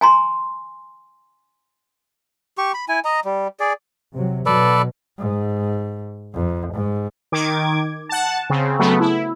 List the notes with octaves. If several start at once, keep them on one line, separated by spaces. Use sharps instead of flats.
G#5 A#5 C6
G4 C#6
B5
E4 G#5
D#5 A#5
G3
G#4 D5
C3 F#3
B2 F#3 A4 B4 D5
G#2
F2
G#2
D#3 D6 G#6
F#5 A5
C#3 C4
C#3 F#3 A3 B3
E4